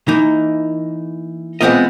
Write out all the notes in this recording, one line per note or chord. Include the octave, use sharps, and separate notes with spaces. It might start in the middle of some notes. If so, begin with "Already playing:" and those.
E3 A#3 D#4
E3 G#3 B3 C4 F4 D#5